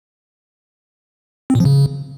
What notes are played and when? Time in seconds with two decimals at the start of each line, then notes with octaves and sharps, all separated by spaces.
1.50 C4
1.55 A#2
1.60 F3
1.65 C#3